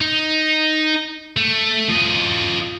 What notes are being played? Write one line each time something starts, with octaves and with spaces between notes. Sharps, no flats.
D#4
A3
F3 D#5